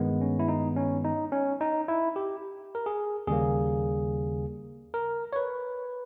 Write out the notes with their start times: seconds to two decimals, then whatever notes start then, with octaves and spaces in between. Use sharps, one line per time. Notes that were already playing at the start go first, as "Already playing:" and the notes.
Already playing: G2 D#3 G#3 B3
0.21 C#4
0.39 E4
0.48 D#4
0.77 C#4
1.04 D#4
1.32 C#4
1.61 D#4
1.88 E4
2.16 G4
2.75 A#4
2.86 G#4
3.27 D#2 C#3 G3 A#3 G#4
4.94 A#4
5.33 C#5
5.36 B4